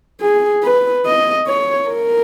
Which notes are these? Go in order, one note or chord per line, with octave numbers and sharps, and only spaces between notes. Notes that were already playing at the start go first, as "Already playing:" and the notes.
G#4
B4
D#5
C#5
A#4